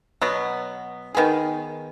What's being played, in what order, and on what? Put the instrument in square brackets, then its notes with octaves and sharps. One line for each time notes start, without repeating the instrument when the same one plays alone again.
[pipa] B2 F#3 B3
D#3 B3 G#4